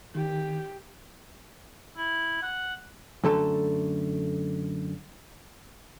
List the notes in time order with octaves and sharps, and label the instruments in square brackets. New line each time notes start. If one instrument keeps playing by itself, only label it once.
[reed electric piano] D#3 [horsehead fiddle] G4
[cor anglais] E4
F#5
[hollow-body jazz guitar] F#2 D3 A3 A4